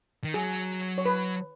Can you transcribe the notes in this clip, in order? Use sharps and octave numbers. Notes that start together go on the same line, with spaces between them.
D#3
F#3 G#4
C#5
B4